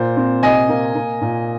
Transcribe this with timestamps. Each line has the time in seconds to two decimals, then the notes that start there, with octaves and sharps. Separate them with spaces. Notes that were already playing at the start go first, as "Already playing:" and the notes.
Already playing: A#2 C5
0.17 C4
0.43 C3 D#5 G#5
0.69 A#3
0.95 A#3
1.21 A#2